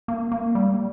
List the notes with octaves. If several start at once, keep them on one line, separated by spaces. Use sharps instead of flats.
A#3
A#3
G3